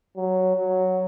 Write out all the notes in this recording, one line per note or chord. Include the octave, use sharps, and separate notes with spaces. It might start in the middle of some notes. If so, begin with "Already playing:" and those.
F#3
F#3